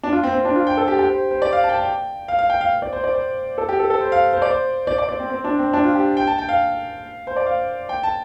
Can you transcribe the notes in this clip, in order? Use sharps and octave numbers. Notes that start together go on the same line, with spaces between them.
D4
F4
C4
C4
D4
F4
G5
A4
G4
G4
C5
C5
D5
F5
A5
G5
A5
G5
F5
F5
G5
F5
D5
C5
D5
C5
A4
G4
A4
A4
C5
F5
C5
D5
C5
D5
D5
D5
C4
C4
D4
C4
D4
F4
G4
G5
A5
G5
F5
C5
D5
F5
G5
A5